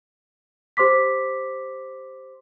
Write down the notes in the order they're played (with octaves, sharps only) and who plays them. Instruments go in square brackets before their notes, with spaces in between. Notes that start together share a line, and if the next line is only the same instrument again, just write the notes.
[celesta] G4 C5 C6 D6 B6